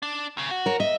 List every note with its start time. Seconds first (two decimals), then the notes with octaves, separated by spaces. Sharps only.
0.03 D4
0.37 D#2 C#3
0.51 F#4
0.66 A#4 C#5
0.80 D#5 E5